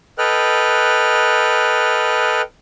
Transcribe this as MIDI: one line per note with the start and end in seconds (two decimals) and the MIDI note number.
0.18 2.41 69
0.18 2.41 71
0.18 2.41 75
0.18 2.41 79
0.18 2.41 89
0.18 2.41 90